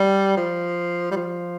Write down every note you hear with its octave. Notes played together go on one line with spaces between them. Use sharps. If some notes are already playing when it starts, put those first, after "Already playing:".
Already playing: G3
F3
G3
F3